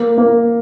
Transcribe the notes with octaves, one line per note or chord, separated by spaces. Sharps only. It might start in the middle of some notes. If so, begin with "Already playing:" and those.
Already playing: A#3
A#3